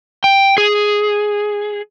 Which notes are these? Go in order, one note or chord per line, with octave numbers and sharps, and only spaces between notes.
G5
G#4